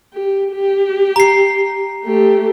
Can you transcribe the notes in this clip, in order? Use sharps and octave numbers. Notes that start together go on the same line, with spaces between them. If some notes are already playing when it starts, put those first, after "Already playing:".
G4
G4
A#5 C7
A3 G4